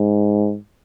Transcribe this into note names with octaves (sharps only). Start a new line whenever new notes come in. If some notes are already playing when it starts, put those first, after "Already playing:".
Already playing: G#2